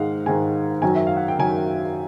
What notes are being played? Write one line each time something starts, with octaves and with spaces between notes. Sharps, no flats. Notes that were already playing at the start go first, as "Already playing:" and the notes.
Already playing: G#2 D#3 G#3 F5 F#5
G#2 D#3 G#3 G#5
F#2 D#3 F#3 G#5
E5
F5
F#5
G5
F#2 D#3 F#3 G#5